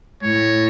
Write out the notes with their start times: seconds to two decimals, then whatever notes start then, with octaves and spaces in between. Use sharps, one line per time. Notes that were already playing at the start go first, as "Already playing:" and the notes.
0.23 A2 C#5